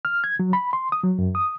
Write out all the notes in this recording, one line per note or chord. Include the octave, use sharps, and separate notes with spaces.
F6
G#6
F#3
B5
C6
D#6
F#3
F#2
D#6